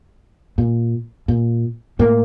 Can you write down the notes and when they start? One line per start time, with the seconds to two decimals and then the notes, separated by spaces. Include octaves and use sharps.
0.58 A#2
1.28 A#2
1.99 A2 A#3